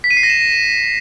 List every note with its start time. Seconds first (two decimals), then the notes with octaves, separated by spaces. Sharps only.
0.04 B6
0.10 D#7
0.17 C7
0.23 A#6
0.30 E7